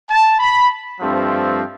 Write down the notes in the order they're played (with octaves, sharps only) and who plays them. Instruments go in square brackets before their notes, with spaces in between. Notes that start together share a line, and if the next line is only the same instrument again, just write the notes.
[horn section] A5
B5
G2 F3 A3 C4